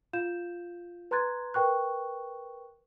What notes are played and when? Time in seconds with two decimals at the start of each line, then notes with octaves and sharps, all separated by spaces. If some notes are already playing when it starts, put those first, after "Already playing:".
0.13 F4 F5 G6 E7
1.11 B4 A#5 C6 F#6 G#6 A6
1.54 A#4 B4 G5 C#6 F#6